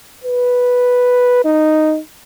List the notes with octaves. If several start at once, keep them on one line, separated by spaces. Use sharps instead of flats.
B4
D#4